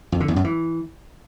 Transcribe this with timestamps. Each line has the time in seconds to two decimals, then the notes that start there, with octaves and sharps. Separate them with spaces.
0.12 F2
0.20 D3
0.28 E2
0.36 F#2
0.44 E3